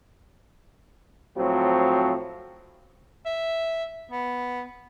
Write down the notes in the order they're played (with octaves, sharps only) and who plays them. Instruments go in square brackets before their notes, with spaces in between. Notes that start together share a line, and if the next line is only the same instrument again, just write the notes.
[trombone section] A2 F3 F#3 C4
[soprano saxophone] E5
B3